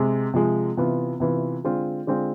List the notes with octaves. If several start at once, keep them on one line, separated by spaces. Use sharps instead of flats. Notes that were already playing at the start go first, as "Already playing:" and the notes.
Already playing: C3 G#3
C3 F3 G#3
C3 E3 B3 F4
C3 E3 B3 F4
D3 G#3 C4 F4
D3 G#3 C4 F4